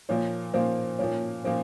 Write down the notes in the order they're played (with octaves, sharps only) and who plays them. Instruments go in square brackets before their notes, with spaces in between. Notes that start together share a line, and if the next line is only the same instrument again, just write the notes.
[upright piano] A#2 F3 A#3 [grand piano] C#5
[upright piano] A#2 F3 A#3 [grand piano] C5
[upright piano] A#2 F3 A#3 [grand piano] C#5
[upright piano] A#2 F3 A#3 [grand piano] C5